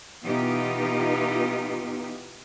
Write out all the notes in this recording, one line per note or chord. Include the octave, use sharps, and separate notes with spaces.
B2 E3 B3 D#4 F4 G4